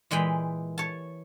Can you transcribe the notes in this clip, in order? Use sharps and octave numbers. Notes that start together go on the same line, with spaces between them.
A#2 E3 G#3 G5 B5
C#5 A5